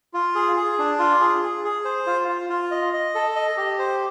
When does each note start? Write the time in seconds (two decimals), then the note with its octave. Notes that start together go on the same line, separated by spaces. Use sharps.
0.14 F4
0.35 G#4
0.57 G#4
0.79 D4
0.99 F4
1.20 G#4
1.42 G#4
1.64 G#4
1.85 C5
2.06 F4
2.28 F4
2.50 F4
2.71 D#5
2.93 D#5
3.15 A4
3.36 D#5
3.57 G4
3.79 C5